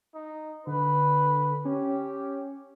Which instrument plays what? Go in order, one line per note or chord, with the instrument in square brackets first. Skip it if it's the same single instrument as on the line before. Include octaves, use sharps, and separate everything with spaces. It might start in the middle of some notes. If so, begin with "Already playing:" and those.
[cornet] D#4
[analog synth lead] D3 [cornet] B4
[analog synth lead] C#4 [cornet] G4